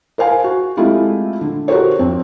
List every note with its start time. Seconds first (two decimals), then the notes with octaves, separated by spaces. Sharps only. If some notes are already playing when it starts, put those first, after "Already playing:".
0.18 A#4 C5 F5 G#5
0.44 F#4
0.77 G#3 A3 C4 E4 F4 G4
1.41 D3
1.68 F#4 G4 A4 A#4 C5 C#5
1.99 F2 C4